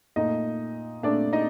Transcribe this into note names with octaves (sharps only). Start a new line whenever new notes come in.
A#2 A3 D#4 D#5
A#2 A3 D4 D5
D#4 D#5